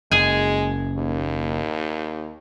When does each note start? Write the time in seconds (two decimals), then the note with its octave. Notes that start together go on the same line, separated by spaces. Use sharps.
0.11 F#1 G#3 G#4 G#5
0.97 D#2